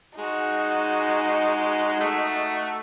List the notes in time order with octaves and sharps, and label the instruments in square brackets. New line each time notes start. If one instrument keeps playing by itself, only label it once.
[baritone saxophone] G#3 [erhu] D#4 [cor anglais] F#4
[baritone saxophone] A3